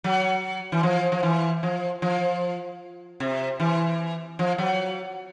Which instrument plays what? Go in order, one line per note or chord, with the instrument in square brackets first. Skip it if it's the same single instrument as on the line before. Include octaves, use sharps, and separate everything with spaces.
[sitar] F#3
E3
F3
F3
E3
F3
F3
C3
E3
F3
F#3